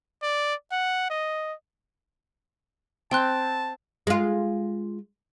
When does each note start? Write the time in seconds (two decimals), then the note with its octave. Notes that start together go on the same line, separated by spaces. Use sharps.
0.22 D5
0.72 F#5
1.10 D#5
3.11 C4 G5 A5 C6 F#6
4.07 G#3 F4